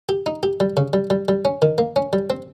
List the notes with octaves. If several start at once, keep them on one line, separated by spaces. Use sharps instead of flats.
G4
D#4
G4
G3
C#3
G3
G3
G3
C#4
D#3
A#3
C#4
G3
C4